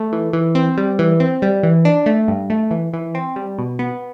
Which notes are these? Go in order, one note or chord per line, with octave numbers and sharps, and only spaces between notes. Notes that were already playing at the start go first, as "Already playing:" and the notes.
Already playing: A3
E3
E3
C4
G3
E3
C4
G3
E3
D4
A3
G2
A3
E3
E3
C4
G3
B2
B3